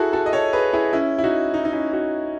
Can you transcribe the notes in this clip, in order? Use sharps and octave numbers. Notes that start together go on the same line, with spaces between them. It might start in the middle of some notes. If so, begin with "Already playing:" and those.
Already playing: E4 F#4 G#4 A4
F#4 A4
D#5
A4 C#5
G#4 B4
E4 G#4
C#4 E4
E4
D#4 F#4
D#4
D#4
C#4 E4
D#4 F#4